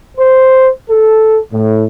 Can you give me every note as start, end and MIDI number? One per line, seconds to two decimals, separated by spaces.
0.17 0.68 72
0.89 1.37 69
1.51 1.85 45